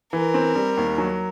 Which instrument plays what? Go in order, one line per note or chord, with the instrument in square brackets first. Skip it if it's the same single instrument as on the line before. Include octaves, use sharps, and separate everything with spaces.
[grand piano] E3 [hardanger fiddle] A#4
[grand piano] C4
G3
D#2
F#3